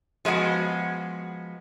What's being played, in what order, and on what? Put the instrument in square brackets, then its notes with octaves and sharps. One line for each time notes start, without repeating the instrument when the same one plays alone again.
[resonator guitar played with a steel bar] F3 G#3 B3 F#4